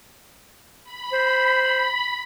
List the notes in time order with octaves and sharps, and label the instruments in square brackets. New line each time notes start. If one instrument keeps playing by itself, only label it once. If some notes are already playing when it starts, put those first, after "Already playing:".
[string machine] B5
[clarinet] C5